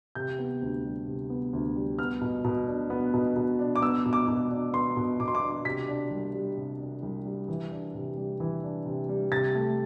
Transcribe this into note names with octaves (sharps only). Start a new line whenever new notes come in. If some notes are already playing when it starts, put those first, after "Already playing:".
C3 G6
B3
D2
G3
C3
B3
D2
G3
B3 F6
B2
B2
D4
B3
B2
B2
D4
D6
B3 E6
B2
D6
B2
D4
B3 C6
B2
B2 D6
C6
D6
D4
C3 B6
D4
C2
G3
C3
D4
C2
G3
E3
D4
C3
G3
E3
D4
C3
G3
C3 A6
A3